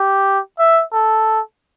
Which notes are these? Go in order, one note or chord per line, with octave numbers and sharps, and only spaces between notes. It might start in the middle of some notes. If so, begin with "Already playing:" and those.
Already playing: G4
E5
A4